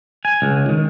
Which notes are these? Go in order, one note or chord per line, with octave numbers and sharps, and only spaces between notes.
G#5
C#2
D#3